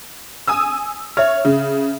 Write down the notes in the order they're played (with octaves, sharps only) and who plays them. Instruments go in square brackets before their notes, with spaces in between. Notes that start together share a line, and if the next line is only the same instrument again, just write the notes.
[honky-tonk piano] G#5 D#6 E6
[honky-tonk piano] C#5 [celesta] E5 F6
[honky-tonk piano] C#3